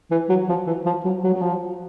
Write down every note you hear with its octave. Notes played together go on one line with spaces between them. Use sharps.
E3
F#3
F3
E3
F3
F#3
F#3
F#3
F3